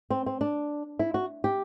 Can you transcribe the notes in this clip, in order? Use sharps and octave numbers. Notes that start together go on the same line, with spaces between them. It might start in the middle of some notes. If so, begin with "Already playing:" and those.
C4
C4
D4
E4
F#4
G4